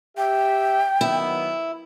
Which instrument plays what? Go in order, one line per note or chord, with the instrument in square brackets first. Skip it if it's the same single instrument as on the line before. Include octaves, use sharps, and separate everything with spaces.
[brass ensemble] G4 E5 [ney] G5
[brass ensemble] D#3 F#3 B3 [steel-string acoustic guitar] E4